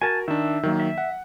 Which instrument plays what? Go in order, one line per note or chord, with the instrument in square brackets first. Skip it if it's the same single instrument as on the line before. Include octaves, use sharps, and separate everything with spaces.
[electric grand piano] F#4 A#4 [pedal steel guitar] G#5 A5
[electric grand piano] D#3 D4 [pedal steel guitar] E5
[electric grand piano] D#3 F#3 A#3
[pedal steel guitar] E5
[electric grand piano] F#5